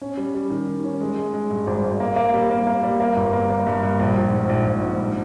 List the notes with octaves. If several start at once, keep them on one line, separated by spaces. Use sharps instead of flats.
C#4
G3
G3
D#3
D#3
C#4
G#3
G#3
G#3
G2
G#1
G#1
A#3
A#3
G3
A#3
A#3
G3
A#3
G1
A#3
A#3
G2
G2
A#1
A#1
G#2
A#1
A#1
G#2
G2